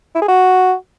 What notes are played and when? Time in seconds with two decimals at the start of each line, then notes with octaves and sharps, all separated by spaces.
0.15 E4
0.22 G#4
0.28 F#4